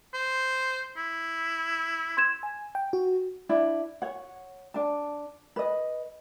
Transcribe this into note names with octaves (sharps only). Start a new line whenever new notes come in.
C5
E4
C6 G#6 E7
G#5
G5
F#4
D4 E4
C#5 F#5
D4 A5
B4 D#5